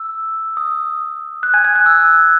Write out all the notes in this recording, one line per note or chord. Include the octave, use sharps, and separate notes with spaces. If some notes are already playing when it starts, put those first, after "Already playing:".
Already playing: E6
D#6
F#6
G#5 G#6
G#5 G#6
F#6
E6